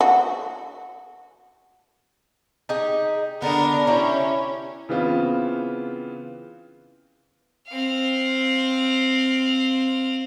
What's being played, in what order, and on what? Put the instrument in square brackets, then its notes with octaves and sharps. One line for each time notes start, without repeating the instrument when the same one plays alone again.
[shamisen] F#4
[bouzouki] D#4 G4 G#4
[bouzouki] D3 B3 [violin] D4 A#4
[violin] C#4 [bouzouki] E4 G4
[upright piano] C#3 E3 B3 C4 F4
[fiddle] C4 F5